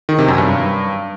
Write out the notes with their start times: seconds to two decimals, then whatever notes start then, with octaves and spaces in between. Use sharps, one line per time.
0.09 D#3
0.18 C3
0.28 F#2
0.38 G2